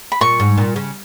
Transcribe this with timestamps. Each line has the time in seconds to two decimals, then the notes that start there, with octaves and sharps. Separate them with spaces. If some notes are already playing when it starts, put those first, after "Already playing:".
0.12 B5
0.21 A#2 C#6
0.40 G#2
0.58 A#2
0.76 C#3